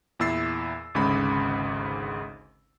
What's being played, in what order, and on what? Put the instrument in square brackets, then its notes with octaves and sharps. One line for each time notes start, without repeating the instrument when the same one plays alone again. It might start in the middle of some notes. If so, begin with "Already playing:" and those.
[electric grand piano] E2 A#2 E4 E6 A6 C7
G#1 D2 G#2 C#3 B5